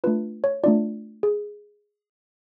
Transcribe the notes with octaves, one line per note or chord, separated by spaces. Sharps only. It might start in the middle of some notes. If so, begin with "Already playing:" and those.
A3 D4 F4 B4
C#5
A3 D4 F4 D5
G#4